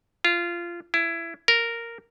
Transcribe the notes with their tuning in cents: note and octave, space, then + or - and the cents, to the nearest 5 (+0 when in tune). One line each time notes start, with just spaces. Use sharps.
F4 -15
E4 +20
A#4 -5